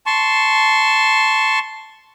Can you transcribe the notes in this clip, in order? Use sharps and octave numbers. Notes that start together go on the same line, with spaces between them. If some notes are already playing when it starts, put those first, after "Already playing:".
A5 C6 C#6